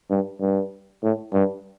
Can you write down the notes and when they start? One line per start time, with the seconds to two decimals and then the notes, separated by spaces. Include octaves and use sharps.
0.10 G2
0.41 G2
1.03 A2
1.33 G2